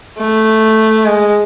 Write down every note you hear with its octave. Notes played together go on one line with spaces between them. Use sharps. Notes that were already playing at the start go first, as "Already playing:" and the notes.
A3
G#3